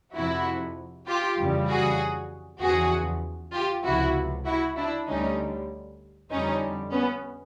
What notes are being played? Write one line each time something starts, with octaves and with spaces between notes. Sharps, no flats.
F2 C3 F3 E4 F#4
F4 G4
F2 C#3 E3 G3
F#4 G#4
E2 C#3 F3 F#4 G#4
F4 G4
C#2 C3 F3 E4 F#4
E4 F#4
D4 E4
D2 D3 G3 C#4 D#4
F2 D3 G3 C#4 D#4
B3 C#4